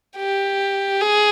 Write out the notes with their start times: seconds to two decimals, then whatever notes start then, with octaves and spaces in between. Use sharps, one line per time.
0.17 G4
1.01 G#4